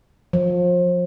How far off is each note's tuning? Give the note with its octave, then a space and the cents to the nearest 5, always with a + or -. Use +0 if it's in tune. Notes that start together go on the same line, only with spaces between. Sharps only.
F3 +30